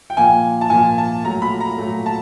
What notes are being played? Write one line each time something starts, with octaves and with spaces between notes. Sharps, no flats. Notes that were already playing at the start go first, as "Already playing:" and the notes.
G5
A#2 F3 A#3 G#5
A5
A#2 F3 A#3 G#5
A5
A#2 F#3 A3 A#5
B5
A#5
A#2 F#3 A3
A5